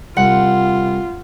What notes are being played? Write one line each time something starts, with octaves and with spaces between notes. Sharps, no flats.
C2 F4 F#5